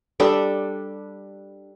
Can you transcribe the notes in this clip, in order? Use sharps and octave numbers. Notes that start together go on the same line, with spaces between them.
G3 D4 A4